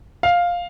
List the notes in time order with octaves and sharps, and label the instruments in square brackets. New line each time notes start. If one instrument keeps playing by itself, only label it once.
[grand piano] F5